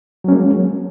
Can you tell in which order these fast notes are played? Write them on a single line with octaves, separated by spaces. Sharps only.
F#3 C#4 A#3 G#3